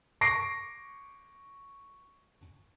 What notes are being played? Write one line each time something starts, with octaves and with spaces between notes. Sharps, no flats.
C#6 D6 A#6 C7 D7